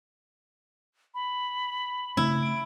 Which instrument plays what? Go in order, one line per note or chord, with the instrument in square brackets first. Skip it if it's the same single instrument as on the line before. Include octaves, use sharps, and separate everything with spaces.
[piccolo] B5
[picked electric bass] C#3 A3 C4 [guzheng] E4
[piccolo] D7